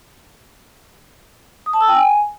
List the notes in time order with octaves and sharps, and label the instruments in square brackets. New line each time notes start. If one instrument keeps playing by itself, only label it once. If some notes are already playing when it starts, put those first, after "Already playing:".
[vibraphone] D#6
A5
E6
G5
G#5